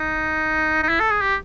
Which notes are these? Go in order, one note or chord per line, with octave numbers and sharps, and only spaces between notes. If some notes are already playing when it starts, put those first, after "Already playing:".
Already playing: D#4
D#4
E4
A4
G#4
G4